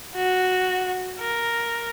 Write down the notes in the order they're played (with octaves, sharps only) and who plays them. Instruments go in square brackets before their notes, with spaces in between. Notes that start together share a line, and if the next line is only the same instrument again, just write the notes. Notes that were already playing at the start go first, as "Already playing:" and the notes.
[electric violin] F#4
A#4